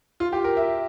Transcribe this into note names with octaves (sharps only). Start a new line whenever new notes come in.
F4
G4
A#4
E5